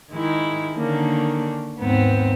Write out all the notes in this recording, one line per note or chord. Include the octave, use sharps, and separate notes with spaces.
D#3 G#3 E4
D3 D#3 A#3 C#4 D4
D#2 G#2 B3 C4